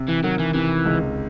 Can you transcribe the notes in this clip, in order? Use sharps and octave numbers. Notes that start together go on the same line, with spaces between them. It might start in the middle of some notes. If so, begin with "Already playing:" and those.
Already playing: C3
E3
D#3 F#3
E3
C3 E3
C#2